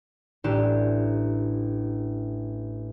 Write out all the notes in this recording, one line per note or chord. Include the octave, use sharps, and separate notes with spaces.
A1 D4 G4 E6